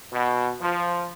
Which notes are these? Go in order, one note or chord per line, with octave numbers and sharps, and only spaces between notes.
B2
F3